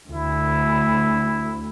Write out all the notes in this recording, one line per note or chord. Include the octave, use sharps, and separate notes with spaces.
D2 E4